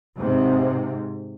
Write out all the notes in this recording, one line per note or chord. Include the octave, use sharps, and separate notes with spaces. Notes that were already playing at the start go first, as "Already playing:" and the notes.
G#2 C3